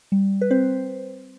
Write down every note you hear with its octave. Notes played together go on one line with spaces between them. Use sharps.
G3
B4
C4 C5